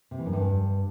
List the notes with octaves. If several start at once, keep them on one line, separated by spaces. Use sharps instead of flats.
C3
E3
F#2
G2